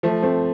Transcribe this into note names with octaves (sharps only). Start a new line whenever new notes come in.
F3 A3
A3 C4